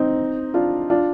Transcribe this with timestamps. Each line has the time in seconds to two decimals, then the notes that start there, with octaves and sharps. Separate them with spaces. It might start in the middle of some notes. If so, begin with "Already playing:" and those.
Already playing: C4 D#4
0.54 D4 F4
0.90 D4 F4